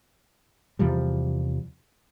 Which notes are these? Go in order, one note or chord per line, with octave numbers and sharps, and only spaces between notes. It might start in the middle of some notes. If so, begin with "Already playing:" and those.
E2 C3 F3 G3